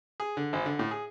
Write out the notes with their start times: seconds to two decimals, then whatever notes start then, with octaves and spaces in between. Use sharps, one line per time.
0.20 G#4
0.37 D3
0.53 G#1
0.66 D3
0.79 A2
0.91 G#4